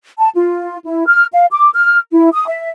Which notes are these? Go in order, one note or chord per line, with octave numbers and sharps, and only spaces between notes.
A5
F4
E4
F6
F5
D6
F6
E4
D#6
E5